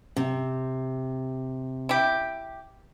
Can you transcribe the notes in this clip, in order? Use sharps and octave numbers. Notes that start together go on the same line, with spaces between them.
C3
E4 G4